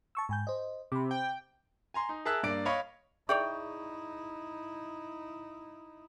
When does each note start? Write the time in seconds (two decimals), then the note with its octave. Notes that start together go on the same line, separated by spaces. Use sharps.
0.15 A5 C#6 E6
0.29 G#2 G#5 G6
0.47 C5 D#5
0.92 C3 B5 D6
1.11 G5
1.94 G#5 A#5 C6
2.09 D#4
2.25 G#4 A#4 E5 A5 E6 F#6
2.43 G2 A#3 D5 D7
2.65 C#5 D#5 F5 B5 C#6
3.29 D#4 E4 G#4 C#5 D5 E5 G5 C#6